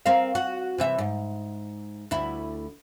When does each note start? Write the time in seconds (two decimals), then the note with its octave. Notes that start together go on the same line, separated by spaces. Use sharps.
0.06 C4 A#4 F5
0.35 F#4
0.78 C3 E3 E5
0.98 G#2
2.11 D2 E4